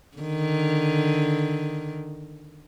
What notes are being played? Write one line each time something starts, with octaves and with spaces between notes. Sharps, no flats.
D3 D#3